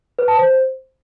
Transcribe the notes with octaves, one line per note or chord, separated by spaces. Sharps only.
B4
A5
C5